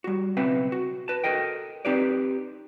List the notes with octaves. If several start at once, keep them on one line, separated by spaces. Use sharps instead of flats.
G3 F#4
B1 C#3 C4 B4 E5 F#5
F#4
B4 A5
F#4 A4 A#4 D#5 G5
C4 D#4 G4 B4 D5